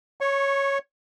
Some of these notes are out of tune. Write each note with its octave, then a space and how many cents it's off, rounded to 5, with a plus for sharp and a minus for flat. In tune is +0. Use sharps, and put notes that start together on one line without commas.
C#5 +0 C#6 -20